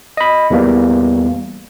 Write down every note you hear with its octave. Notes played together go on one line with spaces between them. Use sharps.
D#5 B5
E2 E3 G3 A#3